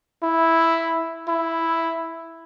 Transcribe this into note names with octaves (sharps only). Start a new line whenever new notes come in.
E4
E4